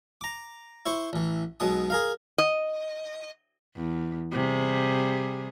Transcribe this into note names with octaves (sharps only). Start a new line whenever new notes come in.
A#5 D6
E4 C5 C#6
A1 E3
B1 B2 G#3 D#6
G#4 A#4 F5
D#5
E2
C3 G3 G#4